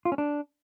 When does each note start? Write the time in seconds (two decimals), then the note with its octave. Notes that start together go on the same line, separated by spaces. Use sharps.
0.05 F4
0.12 C#4
0.18 D4